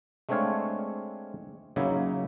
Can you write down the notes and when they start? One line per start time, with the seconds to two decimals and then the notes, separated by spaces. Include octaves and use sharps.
0.29 G#3 A3 C4 D4 C#5 F5
1.76 C#3 F#3 A#3 D#4 E4